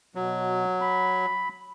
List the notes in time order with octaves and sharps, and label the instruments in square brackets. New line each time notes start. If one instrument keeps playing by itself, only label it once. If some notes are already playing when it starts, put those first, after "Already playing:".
[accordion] B2 [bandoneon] F#3
[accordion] B5